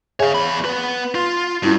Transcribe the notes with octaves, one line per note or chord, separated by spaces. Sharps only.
G#4 C#5 E5 F5 G#5
E2 B5
B3 B4
F4
G2 C#4 E4 F#4